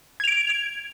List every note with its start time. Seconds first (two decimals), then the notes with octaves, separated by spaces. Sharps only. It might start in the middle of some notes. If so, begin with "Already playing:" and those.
0.20 G#6
0.24 F7
0.27 D7